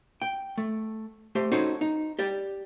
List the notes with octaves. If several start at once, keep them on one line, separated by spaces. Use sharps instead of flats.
G5
A3
A3 G4 C5
C#4 D#4 F#4 A4 C5 C#5
D#4
G4 D5